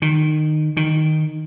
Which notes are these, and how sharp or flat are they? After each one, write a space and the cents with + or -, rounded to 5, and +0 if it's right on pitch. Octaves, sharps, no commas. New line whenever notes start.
D#3 -20
D#3 -5